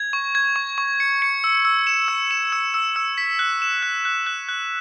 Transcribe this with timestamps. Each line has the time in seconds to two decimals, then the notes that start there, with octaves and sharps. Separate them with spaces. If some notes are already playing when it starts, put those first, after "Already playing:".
Already playing: G#6
0.13 C#6
0.35 G#6
0.56 C#6
0.78 C#6
1.00 C#7
1.22 C#7
1.44 E6
1.65 E6
1.87 E7
2.08 E6
2.31 E7
2.52 E6
2.74 E6
2.96 E6
3.18 B6
3.39 F#6
3.62 E7
3.83 F#6
4.05 F#6
4.27 F#6
4.49 F#6